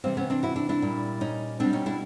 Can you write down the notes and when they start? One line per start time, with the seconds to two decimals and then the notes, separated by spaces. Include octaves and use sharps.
0.04 C3 E3 G3 A#3 C4
0.17 B3 C#4
0.30 C4 D4
0.43 E4 F#4
0.56 D4 E4
0.69 D4 E4
0.82 A#2 G3
1.21 C#4 D#4
1.60 B2 G3 C4 D4
1.73 C#4 D#4
1.86 D4 E4